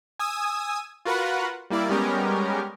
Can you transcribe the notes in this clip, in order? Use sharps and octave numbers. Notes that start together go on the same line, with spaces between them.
G#5 D#6 E6
F4 F#4 A#4 B4 F#5
G3 A#3 E4 D5
G3 G#3 B3 C#4 G4 A#4